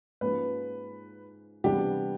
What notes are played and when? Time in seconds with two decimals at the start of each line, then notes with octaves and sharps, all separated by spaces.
0.21 G#2 F3 A#3 C#4 B4
1.64 C3 E3 G3 B3 D4 G4